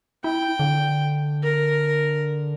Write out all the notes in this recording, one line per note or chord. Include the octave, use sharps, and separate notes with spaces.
E4 G5
D3
A#4